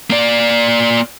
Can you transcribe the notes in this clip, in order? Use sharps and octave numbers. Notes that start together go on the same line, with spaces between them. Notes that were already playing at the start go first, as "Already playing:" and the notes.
A#3 D5